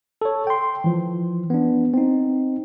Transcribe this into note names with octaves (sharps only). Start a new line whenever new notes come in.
A4 C#5
G5 C6
E3 F3
B3 D4
C4 D#4